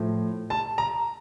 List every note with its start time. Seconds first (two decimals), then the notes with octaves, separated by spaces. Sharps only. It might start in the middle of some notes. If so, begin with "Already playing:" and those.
Already playing: A2 F3
0.50 A5
0.78 A#5